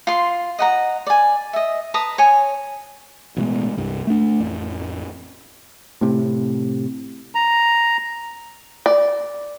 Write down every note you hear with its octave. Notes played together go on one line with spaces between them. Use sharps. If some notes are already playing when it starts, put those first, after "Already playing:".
F4 C6
D#5 F#5 A#5
D5 G#5
D#5 E5
B4 A5 A#5 D#6
C#5 G#5
A1 B2 G#3
C2 G2
A3 D4
A1 F2
A2 C3
A#5
D5